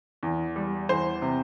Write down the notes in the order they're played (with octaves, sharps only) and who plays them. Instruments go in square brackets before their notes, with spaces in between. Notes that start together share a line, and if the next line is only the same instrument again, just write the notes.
[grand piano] E2
G3
E2 C5
C3